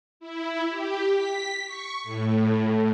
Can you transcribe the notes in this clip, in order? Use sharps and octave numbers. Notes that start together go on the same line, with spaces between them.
E4
G4
B6
C#6
A2